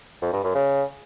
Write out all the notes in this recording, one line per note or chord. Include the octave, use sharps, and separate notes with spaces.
F2
G2
F#2
C#3